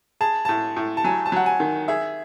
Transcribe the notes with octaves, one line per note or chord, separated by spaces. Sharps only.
G#4 A5
A2 A5
A2
A5
F#3 G#5
A5
F#3 F#5
G#5
D#3
G#4 E5